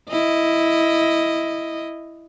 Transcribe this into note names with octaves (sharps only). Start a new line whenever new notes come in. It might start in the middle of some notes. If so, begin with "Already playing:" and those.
E4 D#5